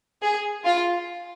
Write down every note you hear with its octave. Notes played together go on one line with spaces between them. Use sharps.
G#4
F4